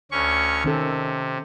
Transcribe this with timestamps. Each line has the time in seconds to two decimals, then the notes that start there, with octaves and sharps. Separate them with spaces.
0.11 D2 C#4 C#6
0.64 C3 D#3 C#4 A4